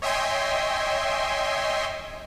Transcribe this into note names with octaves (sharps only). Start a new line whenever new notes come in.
C#5 D#5 E5 G5 G#5 C6